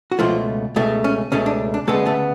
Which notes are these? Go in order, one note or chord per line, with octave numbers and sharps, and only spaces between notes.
F#4
C#2 B2 F3 A3 F4
C#2 B2 A3
C#4
C#2 B2 A3 C#4
D4
D4
D2 C#3 G#3 A3 B3 A4
A3 A4